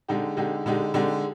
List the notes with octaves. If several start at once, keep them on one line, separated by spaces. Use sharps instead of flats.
D3 G#3 D#4 G4
D3 G#3 D#4 G4
D3 G#3 D#4 G4
D3 G#3 D#4 G4